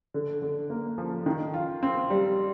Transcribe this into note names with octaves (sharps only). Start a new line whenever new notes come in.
D3
D3
A#3
F3
D#3
F4
C4
G3